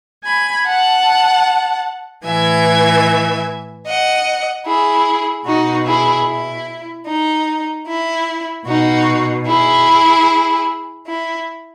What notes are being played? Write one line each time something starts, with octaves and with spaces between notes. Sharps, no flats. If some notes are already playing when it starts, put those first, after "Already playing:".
G#5 B5
F#5 A5
A2 E3 E5 G#5
D#5 F#5
E4 G#4
B2 D#4 F#4
E4 G#4
E4
D#4
E4
B2 D#4 F#4
E4 G#4
E4